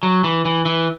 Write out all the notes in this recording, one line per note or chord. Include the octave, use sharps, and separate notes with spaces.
F#3
E3
E3
E3